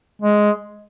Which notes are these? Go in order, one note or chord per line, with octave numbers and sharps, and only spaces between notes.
G#3